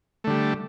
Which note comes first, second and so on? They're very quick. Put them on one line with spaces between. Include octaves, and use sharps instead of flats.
A3 D3 G3